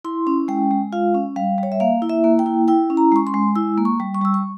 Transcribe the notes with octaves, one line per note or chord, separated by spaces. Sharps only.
E4 C6
C#4
G#3 G5
G#3
F4 F5
C#4
G3 F5
G3
C#5
E5
A#3 F5
E4
E5
A#3
G5
E4
E4 G5
C#4
A#5
G#3 C#6
C6
G#3
E4 E6
A#3
C#6
G3
C#6
G3 E6
C#6